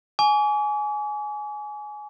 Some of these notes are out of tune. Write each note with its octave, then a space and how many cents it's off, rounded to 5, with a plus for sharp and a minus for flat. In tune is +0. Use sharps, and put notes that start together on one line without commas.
G#5 +15 D6 -45